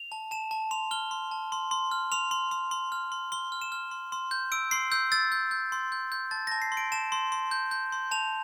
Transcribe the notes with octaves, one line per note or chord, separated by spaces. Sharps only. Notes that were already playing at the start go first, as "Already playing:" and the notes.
Already playing: F7
A5
A5 E7
A5
C6 F7
F6 G7
C6
A5
C6
C6
F6
C6 F7
C6
C6
C6
F6
C6
C6 G7
F6
E7
F6
C6
C6
G6
E6 D7
C6 C7
E6 G6
E6 A6
G6
G6
C6
G6
G6
A5 A6
A5 A#6
C7
C6
D7
A5 E7
C6
C6
G6
G6
C6
A5 F7